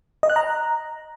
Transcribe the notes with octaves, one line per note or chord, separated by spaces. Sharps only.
D#5
F#6
A#5